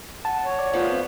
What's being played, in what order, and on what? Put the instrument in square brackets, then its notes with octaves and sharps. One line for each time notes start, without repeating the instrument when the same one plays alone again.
[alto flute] F#5 [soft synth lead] A5
[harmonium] C#5
[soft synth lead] D5
[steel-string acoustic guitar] F3 A3 B3 [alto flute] F4
[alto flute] C4